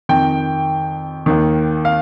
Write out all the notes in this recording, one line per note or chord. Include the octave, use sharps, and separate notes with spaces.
F2 D#3 G5
D#2 D#3
F5